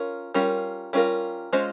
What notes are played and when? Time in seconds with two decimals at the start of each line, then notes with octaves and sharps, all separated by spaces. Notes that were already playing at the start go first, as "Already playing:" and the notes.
Already playing: C#4 F4 A#4
0.34 G3 C#4 F4 A#4
0.93 G3 C#4 F4 A#4
1.53 G#3 C#4 F4 C5 D#5